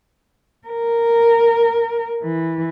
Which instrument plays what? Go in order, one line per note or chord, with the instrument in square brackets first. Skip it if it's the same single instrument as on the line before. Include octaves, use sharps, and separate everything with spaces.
[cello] A#4
E3